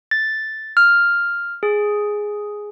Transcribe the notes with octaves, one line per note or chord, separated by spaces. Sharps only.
A6
F6
G#4